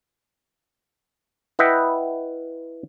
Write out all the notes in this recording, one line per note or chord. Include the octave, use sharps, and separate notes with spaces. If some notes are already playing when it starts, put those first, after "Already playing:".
E4 B4 D#5 E5 F#5 G5